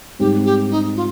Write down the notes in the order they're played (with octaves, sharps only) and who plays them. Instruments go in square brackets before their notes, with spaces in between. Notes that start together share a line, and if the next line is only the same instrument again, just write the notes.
[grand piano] G#2 G3 C4 [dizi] G4
[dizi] G4
D#4
F4